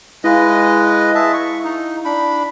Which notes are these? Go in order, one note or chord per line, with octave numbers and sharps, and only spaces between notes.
G#3 E4 B4 D#5 F5
G#4 E5 A5
C#6
D#4
D4 B5